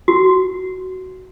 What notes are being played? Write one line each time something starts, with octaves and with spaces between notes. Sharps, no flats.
F#4